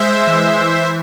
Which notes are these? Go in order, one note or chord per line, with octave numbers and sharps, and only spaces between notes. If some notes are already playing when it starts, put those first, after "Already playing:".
Already playing: G#3 C5 E5
E3
E3